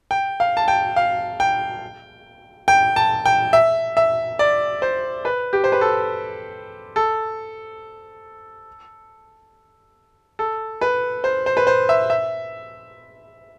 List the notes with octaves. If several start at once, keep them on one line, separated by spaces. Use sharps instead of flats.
G5
F5
A5
G5
F5
G5
G5
A5
G5
E5
E5
D5
C5
B4
G4
C5
B4
A4
A4
A4
B4
C5
C5
B4
C5
E5
E5